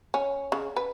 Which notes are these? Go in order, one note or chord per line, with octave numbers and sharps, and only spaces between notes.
C#4
C#3
B4